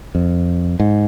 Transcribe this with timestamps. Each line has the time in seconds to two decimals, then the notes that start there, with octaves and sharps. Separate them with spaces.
0.15 F2
0.80 G#2